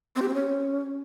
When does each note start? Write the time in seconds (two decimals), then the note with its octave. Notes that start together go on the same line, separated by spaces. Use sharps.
0.16 C4
0.22 G4
0.28 C4
0.34 C#4